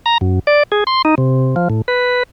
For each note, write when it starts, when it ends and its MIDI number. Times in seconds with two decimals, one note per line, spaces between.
0.06 0.18 82
0.21 0.39 42
0.47 0.63 74
0.72 0.84 68
0.87 1.02 84
1.05 1.15 63
1.18 1.55 48
1.56 1.68 53
1.70 1.81 45
1.88 2.23 71